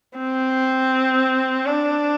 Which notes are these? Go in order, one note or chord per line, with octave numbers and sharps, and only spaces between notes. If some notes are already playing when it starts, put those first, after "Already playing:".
C4
D4